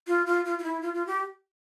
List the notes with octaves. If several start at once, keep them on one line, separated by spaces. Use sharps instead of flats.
F4
F4
F4
F4
E4
F4
F4
G4